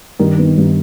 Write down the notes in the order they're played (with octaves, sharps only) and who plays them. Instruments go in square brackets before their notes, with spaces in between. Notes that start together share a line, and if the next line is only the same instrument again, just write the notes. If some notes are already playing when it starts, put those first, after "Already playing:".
[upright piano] G2 [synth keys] D#3
[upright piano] B3
G2